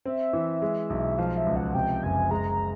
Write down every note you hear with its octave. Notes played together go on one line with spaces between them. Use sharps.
C4 E5
E3
G#3
B1
F3 F5
E5
C#2
F#5
C3 G5
F#1 G#5
G#3 A#5
A#5